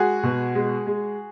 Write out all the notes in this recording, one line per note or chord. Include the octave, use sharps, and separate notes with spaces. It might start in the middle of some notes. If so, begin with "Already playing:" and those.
Already playing: G#3 F#4 G#4
B2
G#3
G#3